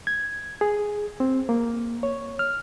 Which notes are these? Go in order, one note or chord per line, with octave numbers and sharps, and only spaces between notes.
G#6
G#4
C4
A#3
C#5
F6